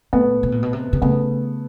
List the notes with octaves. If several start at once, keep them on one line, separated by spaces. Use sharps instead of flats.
A#2 A3 B3
B2
A#2
B2
C3
C3
C#3 A3 B3